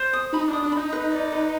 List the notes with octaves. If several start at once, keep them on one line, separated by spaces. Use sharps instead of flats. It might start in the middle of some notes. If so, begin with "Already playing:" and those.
Already playing: C5
D#6
D#4 B5
D4
D#6
D4
D#4 B5
B4
D5
B4